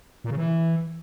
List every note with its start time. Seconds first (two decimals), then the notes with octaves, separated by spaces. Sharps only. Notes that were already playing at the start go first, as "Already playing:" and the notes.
0.24 A#2
0.31 C#3
0.37 E3